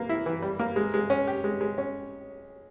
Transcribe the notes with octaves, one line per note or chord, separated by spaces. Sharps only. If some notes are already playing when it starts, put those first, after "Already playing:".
Already playing: E3 A#3
E4
E3
G3
A#3
G#3
G#3
C#4
G4
G#3
G#3
C#4